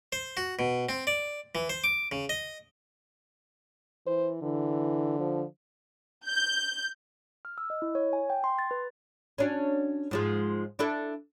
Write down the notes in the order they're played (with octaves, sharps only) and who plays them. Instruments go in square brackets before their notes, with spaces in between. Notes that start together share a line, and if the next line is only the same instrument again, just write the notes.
[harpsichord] C5
F#4
B2
C4
D5
E3
C5
D6
C#3
D#5
[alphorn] E3 [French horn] C5
[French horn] D3 [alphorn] E3
[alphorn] F3
[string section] G6
[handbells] F6
E6
D#5
E4
C#5
G#5
G5
C6
A6
B4
[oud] C#4 D4 F#4
G#2 F3 G#3
D4 E4 A4